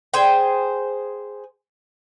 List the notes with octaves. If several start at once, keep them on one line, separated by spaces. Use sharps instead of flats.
G#4 C5 G5